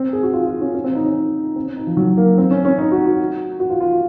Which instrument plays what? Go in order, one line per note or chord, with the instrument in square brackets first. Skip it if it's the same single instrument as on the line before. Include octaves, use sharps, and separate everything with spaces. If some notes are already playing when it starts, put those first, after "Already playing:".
Already playing: [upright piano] C4
G#4
F#4
F4
F4
C#4
C#4
C4
D#4
C#4
C4
C#4
D#4
F3
F#3
A#3
C4
C#4
C#4
D#4
F#4
F#4
F#4
F4
F4